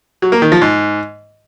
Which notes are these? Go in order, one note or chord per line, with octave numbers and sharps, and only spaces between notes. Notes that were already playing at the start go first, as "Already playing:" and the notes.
F#3
A#3
D#3
F3
G#2